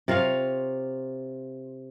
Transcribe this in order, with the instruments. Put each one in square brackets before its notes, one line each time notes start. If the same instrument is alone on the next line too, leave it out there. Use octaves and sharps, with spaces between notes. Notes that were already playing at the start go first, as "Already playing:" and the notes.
[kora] C3 F4 C#5 F5